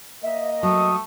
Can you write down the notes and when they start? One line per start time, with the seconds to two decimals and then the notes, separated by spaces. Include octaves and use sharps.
0.22 A#3 D#5 E5
0.63 F#3 A3 D#6